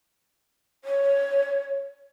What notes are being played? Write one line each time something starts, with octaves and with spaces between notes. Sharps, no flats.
C#5